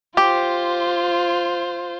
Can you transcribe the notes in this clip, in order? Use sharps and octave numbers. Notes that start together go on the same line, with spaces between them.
F4 G4 C5